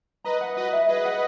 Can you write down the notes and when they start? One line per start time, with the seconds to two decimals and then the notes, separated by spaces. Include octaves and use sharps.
0.24 B4 D#5 A#5
0.41 F#5
0.57 F#4 B4 D#5
0.73 E5
0.89 G#4 B4 D#5
1.05 F#5